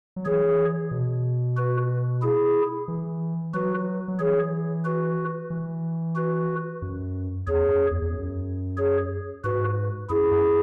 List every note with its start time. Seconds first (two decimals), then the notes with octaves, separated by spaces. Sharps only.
0.16 F#3
0.25 E3 G#4 C#5
0.91 B2
1.57 F#4 B4
2.22 E4 G#4
2.88 E3
3.54 F#3 F#4 B4
4.08 F#3
4.19 E3 G#4 C#5
4.85 F#4 B4
5.50 E3
6.15 F#4 B4
6.82 F#2
7.47 E2 G#4 C#5
7.69 F#2
7.91 E2
8.02 E2
8.12 F#2
8.78 G#4 C#5
9.44 G#2 F#4 B4
10.10 F#2 E4 G#4
10.31 F#2